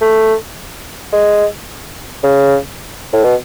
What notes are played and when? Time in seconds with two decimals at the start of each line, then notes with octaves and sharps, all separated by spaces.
0.01 A3
1.12 G#3
2.23 C#3
3.13 A2
3.24 B2